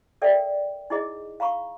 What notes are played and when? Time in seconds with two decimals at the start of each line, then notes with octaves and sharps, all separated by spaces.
0.22 A4 A#4 D5 E5 G5
0.90 D#4 E4 G#4 D#5
1.40 F5 A#5 B5 C#6